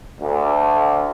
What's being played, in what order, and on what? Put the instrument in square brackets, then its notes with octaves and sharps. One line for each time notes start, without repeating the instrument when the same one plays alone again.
[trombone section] D2